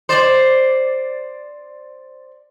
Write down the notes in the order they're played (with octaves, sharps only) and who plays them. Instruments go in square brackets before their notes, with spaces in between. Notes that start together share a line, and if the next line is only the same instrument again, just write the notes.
[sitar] C5 D5